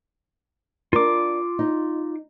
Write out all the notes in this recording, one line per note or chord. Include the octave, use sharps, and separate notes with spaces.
D4 F4 A#4 D6
D#4